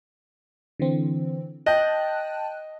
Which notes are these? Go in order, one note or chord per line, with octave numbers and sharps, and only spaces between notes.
D3 E3 C4
D#5 G5 A5 F#6